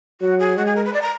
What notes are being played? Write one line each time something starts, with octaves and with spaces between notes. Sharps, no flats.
F#3 F#4
G#4
G#3 F#4
G#4
A#4
B4
D5
A#5